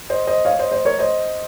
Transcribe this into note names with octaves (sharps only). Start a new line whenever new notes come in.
C5 D#5
C5 D#5
C#5 F5
C5 D#5
C5 D#5
A#4 C#5
C5 D#5